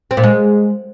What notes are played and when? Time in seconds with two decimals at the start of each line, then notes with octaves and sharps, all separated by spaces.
0.11 C4
0.17 A#2
0.24 G#3